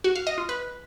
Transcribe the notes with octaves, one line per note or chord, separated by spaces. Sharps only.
F#4
F5
D#5
F4
B4